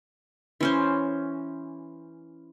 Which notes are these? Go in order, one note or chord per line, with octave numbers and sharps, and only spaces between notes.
E3 C#4 C5